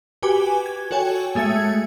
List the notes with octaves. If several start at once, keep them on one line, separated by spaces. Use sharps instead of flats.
F#4 G4 B4 G#5 D6
G#6
F#4 A4 C#5 G5 G#5
G#3 A3 G#4 E5 G#6 C#7